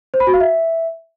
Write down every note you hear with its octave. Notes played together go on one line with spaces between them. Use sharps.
C5
B5
F#4
F5
E5